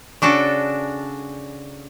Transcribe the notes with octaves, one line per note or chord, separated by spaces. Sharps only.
C#3 D4 F#4 A4